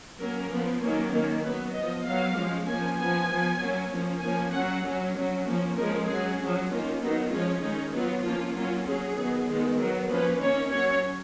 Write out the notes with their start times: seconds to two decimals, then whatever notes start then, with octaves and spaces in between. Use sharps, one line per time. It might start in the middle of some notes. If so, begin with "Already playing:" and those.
0.19 F#3 A#3 C#4 A#4
0.51 F3 B3
0.81 D#3 F#3 A#3 C#4 A#4
1.11 D#3 A#3 C#4
1.43 F#3 B4
1.48 B3
1.73 F3 B3 D#5
2.05 F#3 B3 F5
2.35 F3 G#3 C#4
2.66 F3 A#3 C#4 G#5
2.97 F3 B3 G#5
3.29 F3 B3
3.59 F#3 A#3 C#4
3.90 F3 A#3 C#4
4.21 F3 A#3 C#4 G#5
4.52 F#3 C#4 F#5
4.83 F#3 C#4
5.14 F#3 C#4
5.45 F3 A#3 C#4
5.75 F3 G#3 C#4 A#4
6.07 F#3 C#4 G#4
6.38 F#3 C#4
6.68 D#3 A#3 C#4 F4
7.00 D#3 F#3 B3 D#4
7.31 F3 G#3 C#4 F4
7.61 D#3 G#3 C#4 D#4
7.92 F#3 B3 F4
8.24 F3 A#3 C#4 F4
8.55 F#3 A#3 C#4 F4
8.85 F#3 C#4 G#4
9.16 D#3 F#3 B3
9.47 D#3 G#3 B3
9.79 F#3 B3 A#4
10.09 F3 A#3 C#4 B4
10.39 D#3 A#3 C#4 C#5
10.71 F#3 C#4 C#5